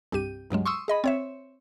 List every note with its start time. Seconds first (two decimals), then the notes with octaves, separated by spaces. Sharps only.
0.12 C2 G2 G4 D#7
0.50 C#2 G2 F#3 G#3
0.66 C6 C#6 D#6 E6
0.88 G#4 D#5 B5
1.04 C4 C#5 E5